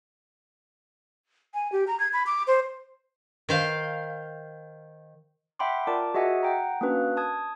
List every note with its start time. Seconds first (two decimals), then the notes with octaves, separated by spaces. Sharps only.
1.54 G#5
1.72 G4
1.87 A#5
2.00 G#6
2.13 B5
2.26 D6
2.47 C5
3.49 D#3 C5 F5
5.59 E5 F#5 G5 B5 C6 D6
5.87 F4 A#4 D5 A5 D6
6.14 F#4 G#4 D#5 E5 F#5 G#5
6.43 F#5 G5 A#5
6.81 A#3 C#4 D4 F#4 B4
7.17 A5 D#6 G#6